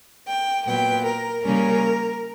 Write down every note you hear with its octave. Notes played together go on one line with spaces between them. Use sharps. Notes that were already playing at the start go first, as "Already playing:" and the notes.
G5
A#2 F#3 B3 G5
A#4
C#3 G3 A#3 C#4 A#4